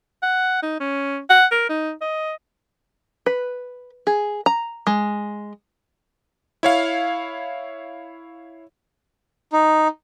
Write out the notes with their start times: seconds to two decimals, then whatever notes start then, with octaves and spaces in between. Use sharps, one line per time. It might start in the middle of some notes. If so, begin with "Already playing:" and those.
0.23 F#5
0.63 D#4
0.80 C#4
1.30 F#5
1.52 A#4
1.69 D#4
2.01 D#5
3.26 B4
4.07 G#4
4.46 A#5
4.87 G#3
6.63 E4 C#5 F5
9.53 D#4